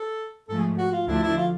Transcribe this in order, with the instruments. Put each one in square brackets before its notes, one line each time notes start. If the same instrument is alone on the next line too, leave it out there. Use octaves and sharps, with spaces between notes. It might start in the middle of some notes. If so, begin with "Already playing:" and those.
Already playing: [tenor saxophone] A4
[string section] G#2 F3 A3 [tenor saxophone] A4
[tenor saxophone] G#4
F#4
F4
[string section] D2 D3 F3 A3 D4 [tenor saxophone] E4
[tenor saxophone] E4
F4